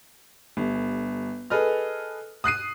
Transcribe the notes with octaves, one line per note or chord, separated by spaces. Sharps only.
G1
G#4 A4 B4 D#5 F6
D#6 F#6 C7 D#7